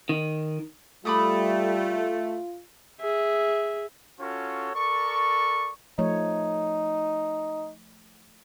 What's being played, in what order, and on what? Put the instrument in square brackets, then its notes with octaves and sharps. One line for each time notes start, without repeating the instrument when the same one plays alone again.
[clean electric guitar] D#3
[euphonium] G3 [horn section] A3 [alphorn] F4 [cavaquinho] B5 D6 D#6
[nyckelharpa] G#4 E5
[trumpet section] C#4 F4 F#4 A4 C#5
A4 A#4 D5 C#6
[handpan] F3 A3 C#5 [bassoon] D#4